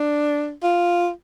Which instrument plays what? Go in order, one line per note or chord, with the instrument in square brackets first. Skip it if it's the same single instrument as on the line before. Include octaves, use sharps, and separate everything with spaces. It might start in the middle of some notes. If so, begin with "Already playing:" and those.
Already playing: [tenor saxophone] D4
F4